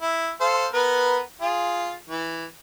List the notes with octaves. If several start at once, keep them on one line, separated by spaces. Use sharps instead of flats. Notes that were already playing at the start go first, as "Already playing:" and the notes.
E4
A4 C5 F5
B3 A#4 B4
F4 G#4
E3